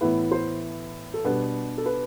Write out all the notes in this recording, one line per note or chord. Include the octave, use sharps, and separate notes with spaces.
A2 E3 B3 E4 B4
C5
A4
B2 G3 B3 D4 B4
A4
B4